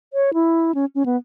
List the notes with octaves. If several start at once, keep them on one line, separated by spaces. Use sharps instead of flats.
C#5
E4
C#4
C#4
B3